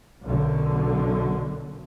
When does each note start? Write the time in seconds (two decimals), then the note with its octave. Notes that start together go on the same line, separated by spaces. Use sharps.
0.24 B1 F#2 D3